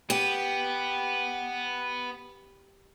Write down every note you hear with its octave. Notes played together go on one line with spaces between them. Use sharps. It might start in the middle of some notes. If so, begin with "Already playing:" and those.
B3 G4